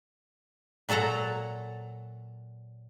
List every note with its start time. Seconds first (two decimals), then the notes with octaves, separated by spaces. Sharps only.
0.89 A#2 F#3 A4 F#5 A#5